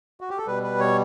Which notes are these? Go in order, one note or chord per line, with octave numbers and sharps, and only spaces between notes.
F#4
G4
A4
B2 G3 B4
B4
C#5